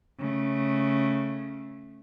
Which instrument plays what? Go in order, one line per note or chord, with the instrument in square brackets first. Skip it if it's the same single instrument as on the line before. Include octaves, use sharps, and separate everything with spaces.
[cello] C#3 A3